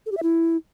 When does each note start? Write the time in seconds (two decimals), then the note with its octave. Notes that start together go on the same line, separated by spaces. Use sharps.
0.06 A4
0.12 G4
0.17 E5
0.23 E4